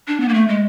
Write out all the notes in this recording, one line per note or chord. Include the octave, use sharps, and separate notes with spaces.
D4
B3
A#3
A3
G#3